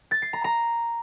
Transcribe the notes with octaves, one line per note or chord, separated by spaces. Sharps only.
A6
C7
A#5
A#5